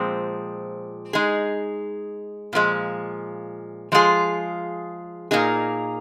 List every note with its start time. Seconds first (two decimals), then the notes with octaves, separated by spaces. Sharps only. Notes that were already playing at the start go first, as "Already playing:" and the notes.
Already playing: A#2 F3 G#3 C4
1.13 G#3 D#4 G#4
2.53 A#2 F3 G#3
3.92 F3 G#3 F4 G#4
5.31 A#2 A#3 D#4 G#4